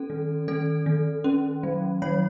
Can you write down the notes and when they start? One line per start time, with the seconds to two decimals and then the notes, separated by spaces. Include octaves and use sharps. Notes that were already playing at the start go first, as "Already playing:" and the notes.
Already playing: C#4 A4
0.10 D#3
0.48 D#3 A4
0.86 D#3
1.24 C#4
1.63 F#3
2.02 F#3 C#5